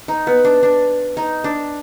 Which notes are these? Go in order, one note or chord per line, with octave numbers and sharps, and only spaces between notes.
D#4
B3
D4
D4
D#4
D4